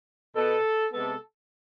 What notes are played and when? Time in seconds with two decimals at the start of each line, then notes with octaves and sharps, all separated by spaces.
0.34 B2 B3 A4
0.92 C3 G#3 B3 A4